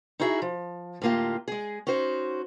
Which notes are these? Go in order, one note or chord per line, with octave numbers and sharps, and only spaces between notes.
D#4 E4 F#4 G#4 E5
F3
A2 D3 A#3 F4 G4
G#3 G#4
C#4 D#4 F#4 C5